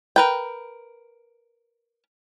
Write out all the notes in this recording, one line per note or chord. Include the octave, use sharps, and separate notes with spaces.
A#4 B4 G5